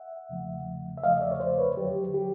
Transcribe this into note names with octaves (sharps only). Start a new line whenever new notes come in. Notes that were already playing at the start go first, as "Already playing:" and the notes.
Already playing: E5 F#5
E2 C#3 F3 A3
E5
E2 C#3 F3 A3 D#5 F5
D5 E5
C#5
C5 D5
B4 C#5
F2 D3 F#3 G4
G4